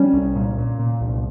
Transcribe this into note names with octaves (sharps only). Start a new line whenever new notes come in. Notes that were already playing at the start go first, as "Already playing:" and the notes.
Already playing: G3 C#4
C2
A#2
A#2
A#2
C2